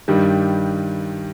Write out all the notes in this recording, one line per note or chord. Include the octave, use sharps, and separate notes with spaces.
G2 D#3 G3